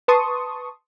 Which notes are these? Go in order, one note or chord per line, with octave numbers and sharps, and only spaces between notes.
B4 A5 C6 C#6 D#6